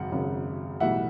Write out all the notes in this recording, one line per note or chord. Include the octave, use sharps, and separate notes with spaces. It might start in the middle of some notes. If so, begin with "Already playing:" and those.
Already playing: G#1 F#2 C#3 F#5
G#1 F#2 C#3
B1 A2 E3 G3 E5 F#5